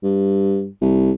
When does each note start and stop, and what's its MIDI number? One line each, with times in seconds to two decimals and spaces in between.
0.03 0.67 43
0.81 1.11 36